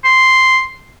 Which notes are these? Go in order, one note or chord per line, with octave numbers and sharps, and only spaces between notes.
C6